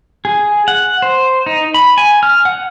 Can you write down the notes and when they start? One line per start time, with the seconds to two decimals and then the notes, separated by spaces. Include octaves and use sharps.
0.25 G#4
0.68 F#5
1.02 C5
1.46 D#4
1.74 B5
1.98 G#5
2.23 F6
2.45 F#5